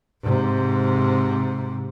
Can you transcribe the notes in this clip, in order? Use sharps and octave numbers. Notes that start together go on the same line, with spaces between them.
G#2 C3